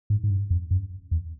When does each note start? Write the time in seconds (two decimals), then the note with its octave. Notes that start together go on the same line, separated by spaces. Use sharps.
0.10 G#2
0.24 G#2
0.30 G2
0.50 F2
0.71 F#2
1.11 E2